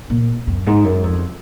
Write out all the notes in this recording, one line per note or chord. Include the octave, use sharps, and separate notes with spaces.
A#2
F#2
G#2
F#2
F2